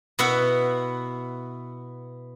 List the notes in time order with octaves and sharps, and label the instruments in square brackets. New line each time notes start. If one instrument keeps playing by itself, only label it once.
[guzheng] B2 B3 E4 E5 F#5